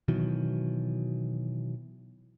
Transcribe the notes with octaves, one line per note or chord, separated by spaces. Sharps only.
B2 D#3 E3 F#3